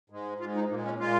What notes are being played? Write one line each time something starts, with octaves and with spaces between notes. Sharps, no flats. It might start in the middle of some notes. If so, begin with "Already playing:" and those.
G#2 G#3
G#2 F4
G#3
D#4
A#2 G#3 A#3
C#4
A#2 G#3 F4